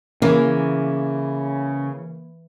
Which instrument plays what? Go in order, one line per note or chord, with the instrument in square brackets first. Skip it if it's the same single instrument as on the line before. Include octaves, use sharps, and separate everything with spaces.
[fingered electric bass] C#3 [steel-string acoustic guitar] E3 [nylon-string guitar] A#3